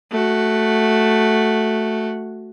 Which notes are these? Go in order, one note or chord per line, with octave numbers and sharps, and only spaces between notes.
A3 F#4